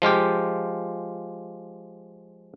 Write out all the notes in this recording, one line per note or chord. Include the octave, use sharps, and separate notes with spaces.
F3 G#3 F4 G4